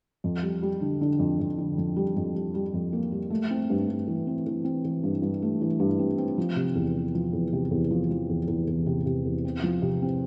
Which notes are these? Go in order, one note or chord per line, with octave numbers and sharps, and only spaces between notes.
F2
G3
G3
D3
D3
F2
F2
D3
F2
G3
F2
G3
G3
F2
A#3
G3
A3
C4
G2
G2
E3
C4
E3
C4
E3
G2
G2
A3
E3
G2
C4
C4
F3
C3
E2
F3
F3
E2
C3
E2
F3
F3
E2
E2
E2
C3
C3
E2
C4
F3
C3
C4